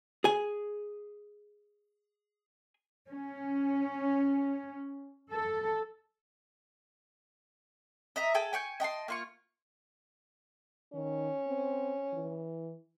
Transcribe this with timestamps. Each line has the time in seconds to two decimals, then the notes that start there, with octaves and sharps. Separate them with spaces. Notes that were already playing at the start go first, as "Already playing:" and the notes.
0.24 G#4 G#5
3.09 C#4
5.32 A4
8.16 D#5 E5 A#5
8.35 G#4 A4 G5
8.53 G5 G#5 C#6 G6
8.80 D#5 G5 A5 C6
9.08 A#3 F4 C#6
10.93 D#3 C#4
11.47 C4
12.13 E3